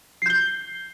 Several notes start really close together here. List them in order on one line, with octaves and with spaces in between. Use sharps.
C7 G6 G7